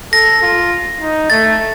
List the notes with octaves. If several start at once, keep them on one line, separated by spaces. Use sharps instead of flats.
A4 A#6
F4
D#4
A3 A6